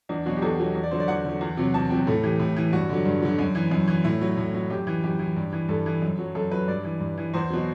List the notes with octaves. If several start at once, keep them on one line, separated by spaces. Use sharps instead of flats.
E2 D4
B2 F#3 F#4
G4
E2 A4
B2 F#3
E2
D5
D3 F#3 C5
D5
E2 F#5
D3 F#3
E2
C3 F#3
E2 A5
C3 F#3 G5
A2 A4
E3 G4
A2
E3
G2 F#4
D3 F#3
G2
D3 F#3
F#2
E3
F#2
E3
A2 E4
F#3
A2
F#3
F#2 G4
E3
F#2 G4
E3
G2
E3
G2 A4
E3
F#2
F#3
F#2 A4
F#3 B4
G2 D5
E3
G2
E3
E2 C5
B2 F#3